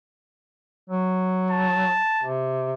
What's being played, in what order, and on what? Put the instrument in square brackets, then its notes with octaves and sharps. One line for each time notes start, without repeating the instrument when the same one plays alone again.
[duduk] F#3
[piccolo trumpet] A5
[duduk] C3